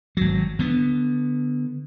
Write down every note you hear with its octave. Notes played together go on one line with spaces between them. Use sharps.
G#1 F#3
D3 B3